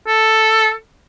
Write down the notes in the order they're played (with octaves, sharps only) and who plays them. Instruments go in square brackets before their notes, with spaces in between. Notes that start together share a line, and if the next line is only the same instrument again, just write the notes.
[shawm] A4